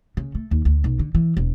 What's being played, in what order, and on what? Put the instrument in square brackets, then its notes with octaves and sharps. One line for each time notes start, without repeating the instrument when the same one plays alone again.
[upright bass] C#3
A3
D#2
D2
B1
D3
E3
E1